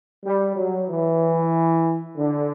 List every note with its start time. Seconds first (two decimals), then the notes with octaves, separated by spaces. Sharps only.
0.24 G3
0.56 F#3
0.88 E3
2.17 D3